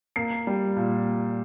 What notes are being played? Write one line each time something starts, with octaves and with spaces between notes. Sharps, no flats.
A#3 C7
G3
A#2